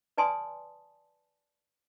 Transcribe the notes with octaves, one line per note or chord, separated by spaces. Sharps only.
B4 D5 G#5 A5 C6 D#6